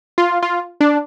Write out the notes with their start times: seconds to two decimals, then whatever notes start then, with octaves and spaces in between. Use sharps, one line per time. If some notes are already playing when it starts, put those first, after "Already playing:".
0.18 F4
0.42 F4
0.81 D4